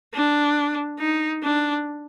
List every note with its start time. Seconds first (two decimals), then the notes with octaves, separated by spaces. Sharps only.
0.14 D4
0.99 D#4
1.43 D4